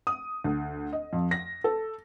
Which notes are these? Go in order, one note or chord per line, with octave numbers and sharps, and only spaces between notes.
D#6
D2
D#5
F2
A#6
A4